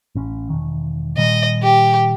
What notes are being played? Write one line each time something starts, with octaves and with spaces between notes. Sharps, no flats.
A1 C#4
E1 D#3
A#2 D#3 G3 D#5
G4